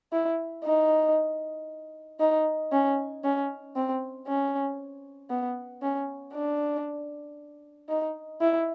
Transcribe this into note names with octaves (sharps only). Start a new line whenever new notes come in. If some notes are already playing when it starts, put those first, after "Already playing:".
E4
D#4
D#4
C#4
C#4
C4
C#4
B3
C#4
D4
D#4
E4